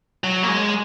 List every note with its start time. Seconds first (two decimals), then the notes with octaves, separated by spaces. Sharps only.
0.24 F#3
0.43 A#3
0.48 G#3